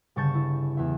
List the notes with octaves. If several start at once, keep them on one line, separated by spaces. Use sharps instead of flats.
G1 C#3 A5 C#6 G6 A6
E4
E2 E5